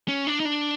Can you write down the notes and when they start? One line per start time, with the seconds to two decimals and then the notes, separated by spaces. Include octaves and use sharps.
0.08 C#4
0.27 D4
0.40 D#4
0.45 D4